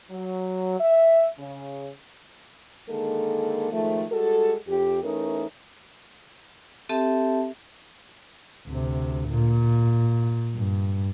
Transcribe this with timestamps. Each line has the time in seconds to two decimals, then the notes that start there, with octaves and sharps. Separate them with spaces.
0.10 F#3
0.80 E5
1.38 C#3
2.90 D3 D#3 G#3 A#3 A4
3.72 G#2 D#3 F3 A3
4.12 G3 G#3 F#4 A4
4.67 F2 G4
5.03 E2 E3 A3 C#4 D#4 A#4
6.89 C4 G4 A4 E5 A5
8.68 D2 C3
9.29 A#2
10.55 G2